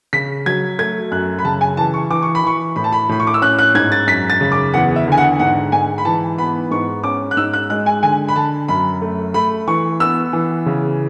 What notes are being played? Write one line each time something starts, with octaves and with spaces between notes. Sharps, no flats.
C#3 B6
F#3 G#6
A3 G#6
F#2 F#6
B5
C#3 A5
G#5
E3 A5
C#6
E3 D6
C#6
B5
E3 C#6
A2 B5
A5
B5
A2 B5
C#6
D6
E6
C#4 F#6
F#6
G#2 G#6
A6
F#2 B6
A6
C#3
D6
E2 F#5
E5
D3 G#5
F#5
G#2 F#5
G#2 G#5
B5
E3 A5
B3 B5
G#2 C#6
C#4 D6
F#6
G#2 E6
F#6
G#3 F#6
G#5
D3 G#5
B5
D3 A5
F#2 B5
A3
A3 B5
E3 C#6
B3 E6
E3
C#3